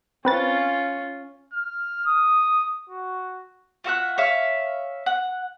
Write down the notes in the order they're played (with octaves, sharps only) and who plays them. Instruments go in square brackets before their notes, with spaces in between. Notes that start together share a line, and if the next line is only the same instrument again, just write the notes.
[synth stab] C4 B4 A6 [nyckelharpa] C#4 F4
[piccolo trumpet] F6
D#6
F#4
[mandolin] F4 F#4 E5 F#6
C#5 E5 F5
F#5